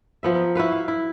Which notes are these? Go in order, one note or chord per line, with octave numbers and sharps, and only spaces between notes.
F3 B3 E5
A#4
E4 F#4 B4 F5
F5
E4